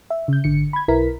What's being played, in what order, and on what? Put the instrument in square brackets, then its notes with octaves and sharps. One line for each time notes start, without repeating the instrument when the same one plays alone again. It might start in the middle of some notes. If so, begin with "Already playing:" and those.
[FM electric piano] E5
C#3 G6
G#1 D3 C#7
B5 G#6
B1 E4 A#4 B4 B6